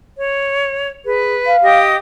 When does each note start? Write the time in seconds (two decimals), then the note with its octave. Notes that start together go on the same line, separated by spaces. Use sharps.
0.18 C#5
1.05 G#4 B4
1.46 F5
1.62 G4 D#5 D#6